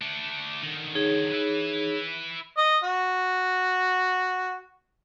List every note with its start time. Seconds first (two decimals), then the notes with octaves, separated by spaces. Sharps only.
0.01 A3 D4
0.63 D3 D#3
0.95 D#4 G#4 C#5
1.31 E4 B4
2.57 D#5
2.84 F#4